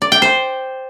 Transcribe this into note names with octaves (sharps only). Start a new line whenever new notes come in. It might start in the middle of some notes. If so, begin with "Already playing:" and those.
D5
G5
C5